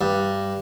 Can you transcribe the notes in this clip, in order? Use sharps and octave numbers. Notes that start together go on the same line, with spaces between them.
G2